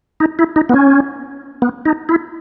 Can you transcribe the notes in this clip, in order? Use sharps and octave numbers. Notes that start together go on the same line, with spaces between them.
D#4
E4
D#4
B3
C#4
B3
D#4
E4